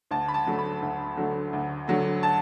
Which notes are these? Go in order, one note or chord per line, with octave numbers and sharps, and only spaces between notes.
D2 A5
B5
A5
D3 F#3 A3
B5
D2
D3 F#3 A3
D2
D3 F#3 A3
A5